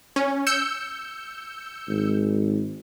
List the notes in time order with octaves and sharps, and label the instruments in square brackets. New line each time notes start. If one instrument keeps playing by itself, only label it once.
[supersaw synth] C#4
E6 G6 C#7
[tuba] G#1